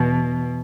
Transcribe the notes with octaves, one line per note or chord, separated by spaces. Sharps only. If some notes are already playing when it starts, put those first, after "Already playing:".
Already playing: E2 B2